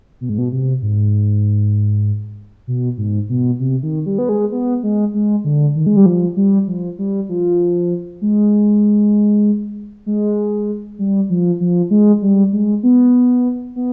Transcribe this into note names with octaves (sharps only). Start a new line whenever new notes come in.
B2
G#2
B2
C3
G#2
B2
G#2
B2
C3
D#3
G3
B3
G#3
B3
G#3
G#3
D3
D#3
G#3
G3
F3
G3
F3
G3
F3
G#3
G#3
G3
F3
F3
G#3
G3
G#3
B3
B3